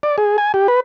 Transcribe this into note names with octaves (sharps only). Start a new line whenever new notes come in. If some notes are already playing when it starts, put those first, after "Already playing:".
D5
G#4
G#5
G4
B4